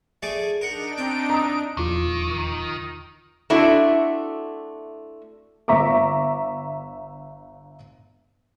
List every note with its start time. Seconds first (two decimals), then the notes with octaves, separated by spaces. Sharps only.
0.23 A3 G#4 D5
0.61 D4 D#4 A#4 F#5 D7
0.98 C4 G5
1.30 A#5 D#6
1.77 D#1 E2 D#3 F3 F4 D6
3.50 A3 C4 D4 E4 F#4
5.68 G1 E5 A#5 C#6 D6